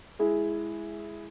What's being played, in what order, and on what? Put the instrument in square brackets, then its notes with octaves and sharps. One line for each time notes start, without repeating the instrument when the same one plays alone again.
[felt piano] G#3 E4 G#4